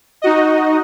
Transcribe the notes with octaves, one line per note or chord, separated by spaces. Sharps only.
D#4 F#4 D#5